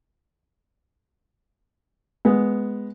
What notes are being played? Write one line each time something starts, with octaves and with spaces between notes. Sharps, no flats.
G#3 B3